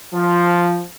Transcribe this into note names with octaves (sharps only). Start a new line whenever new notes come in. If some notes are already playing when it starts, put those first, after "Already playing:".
F3